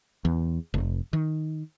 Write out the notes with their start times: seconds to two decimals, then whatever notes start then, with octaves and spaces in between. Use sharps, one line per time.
0.25 E2
0.74 F1
1.13 D#3